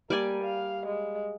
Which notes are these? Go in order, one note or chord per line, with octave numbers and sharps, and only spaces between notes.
G3 A#3 D5 G#5
F5
G#3